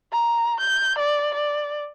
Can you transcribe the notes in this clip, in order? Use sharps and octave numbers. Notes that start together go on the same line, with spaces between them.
A#5
G6
D5
D5